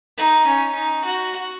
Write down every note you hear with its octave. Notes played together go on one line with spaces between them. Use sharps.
D#4
C#4
D#4
F#4